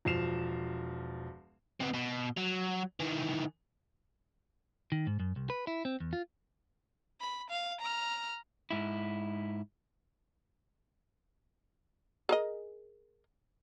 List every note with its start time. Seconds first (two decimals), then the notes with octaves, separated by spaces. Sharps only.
0.05 E1 F3 C7 E7 F7
1.80 C3 B3
1.94 B2
2.37 F#3
3.00 D#3 E3
4.92 D#3
5.07 G#2
5.20 F#2
5.36 C2
5.50 B4
5.67 E4
5.85 C4
6.00 E2
6.13 F4
7.21 B5
7.50 F5
7.81 A#5 F6
8.71 G#2 E4
12.29 G#4 A#4 D#5